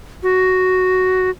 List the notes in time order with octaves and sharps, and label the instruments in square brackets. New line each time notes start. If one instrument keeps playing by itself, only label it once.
[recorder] F#4